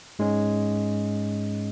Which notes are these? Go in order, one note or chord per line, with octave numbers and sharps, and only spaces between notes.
G#2 G#3 C#4